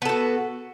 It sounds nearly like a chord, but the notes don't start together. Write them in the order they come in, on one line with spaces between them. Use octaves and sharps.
B3 A4 F#4